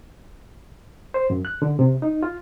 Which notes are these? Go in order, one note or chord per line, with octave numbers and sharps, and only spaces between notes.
C5
F#2
F#6
D3
C3
D#4
F4